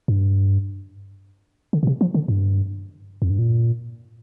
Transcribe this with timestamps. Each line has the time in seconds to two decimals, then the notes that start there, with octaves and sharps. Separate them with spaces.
0.08 G2
1.73 D3
1.83 A#2
1.87 C3
2.01 F3
2.14 D3
2.28 G2
3.22 F2
3.30 G2
3.39 A#2